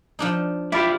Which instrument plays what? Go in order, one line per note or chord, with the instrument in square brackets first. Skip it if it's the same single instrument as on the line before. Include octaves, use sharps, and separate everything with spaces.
[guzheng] F3 D4 D#4
[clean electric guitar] E4 F4 G4 [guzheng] D5 [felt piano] E5 B5